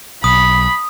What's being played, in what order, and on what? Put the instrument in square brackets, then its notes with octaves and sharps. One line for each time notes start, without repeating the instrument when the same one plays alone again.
[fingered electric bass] B1 [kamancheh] B5 [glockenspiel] D#6